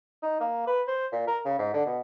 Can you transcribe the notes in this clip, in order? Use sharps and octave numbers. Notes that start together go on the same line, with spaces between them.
D#4
A#3
B4
C5
A#2
A#4
C#3
G#2
D3
B2